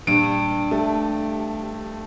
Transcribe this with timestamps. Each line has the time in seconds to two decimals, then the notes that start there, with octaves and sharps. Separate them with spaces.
0.07 G2 A#2 G3 D7
0.71 A3 G4